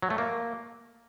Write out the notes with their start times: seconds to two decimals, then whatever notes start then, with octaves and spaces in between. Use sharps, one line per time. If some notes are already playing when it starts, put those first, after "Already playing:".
0.02 F#3
0.10 A3
0.18 A#3